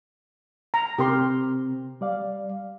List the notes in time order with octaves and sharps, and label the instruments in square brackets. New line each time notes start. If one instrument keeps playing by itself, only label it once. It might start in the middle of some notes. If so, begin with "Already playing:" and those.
[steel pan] A#5
[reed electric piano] C3 C4 [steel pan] G4 A#4 C6
[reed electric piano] G3 D5 F5